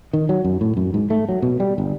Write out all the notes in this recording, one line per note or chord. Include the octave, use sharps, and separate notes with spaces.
D#3
F#3
F#2
A2
F#2
G#2
A3
F#3
B2
G3
G1